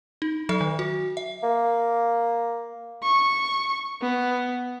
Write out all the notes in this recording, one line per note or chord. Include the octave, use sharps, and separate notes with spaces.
D#4
F#3 A4 E5
D#3
F#4
E5
A#3
C#6
B3